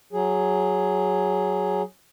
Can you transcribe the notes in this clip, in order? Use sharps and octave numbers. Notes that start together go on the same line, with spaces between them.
F#3 G#4